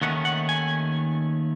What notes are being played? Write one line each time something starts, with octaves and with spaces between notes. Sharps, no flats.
D#2 D#3 A3 C#4 F#5
F#5
G#5